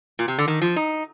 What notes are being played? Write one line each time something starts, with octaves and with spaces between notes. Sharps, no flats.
A#2
C3
D3
D#3
F3
D#4